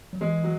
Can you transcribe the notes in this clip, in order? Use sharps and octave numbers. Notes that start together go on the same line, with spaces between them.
F#3
E3 G#3
F#3